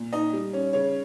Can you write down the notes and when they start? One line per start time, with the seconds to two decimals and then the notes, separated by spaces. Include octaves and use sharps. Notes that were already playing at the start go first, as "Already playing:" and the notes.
Already playing: A#2
0.13 D#4 D#5
0.33 G3
0.53 C#4
0.73 C#3 C#5